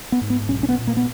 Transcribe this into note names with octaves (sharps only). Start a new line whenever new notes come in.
B3
G#2
B3
B1 C#4
C#4
B3
A#2
A#3
B3